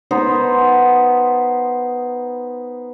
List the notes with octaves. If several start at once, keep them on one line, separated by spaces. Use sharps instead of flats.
B3 D#4 C5